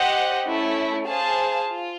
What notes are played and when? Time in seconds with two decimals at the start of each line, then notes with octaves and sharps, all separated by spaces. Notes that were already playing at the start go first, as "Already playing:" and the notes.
Already playing: G4 C5 D#5 F#5
0.47 A3 C#4 E4
1.07 G#4 C5 F5 A5
1.68 F4